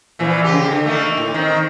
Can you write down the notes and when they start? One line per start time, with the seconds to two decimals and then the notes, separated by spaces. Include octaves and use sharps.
0.19 A#2 E3 F3
0.44 C#3 G4
0.71 D3
0.86 A3 A#3 D#4
1.17 A2
1.34 D#3 C4